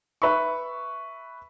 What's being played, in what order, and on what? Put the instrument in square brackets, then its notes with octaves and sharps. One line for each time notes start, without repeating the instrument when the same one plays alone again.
[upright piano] B4 E5 B5 C#6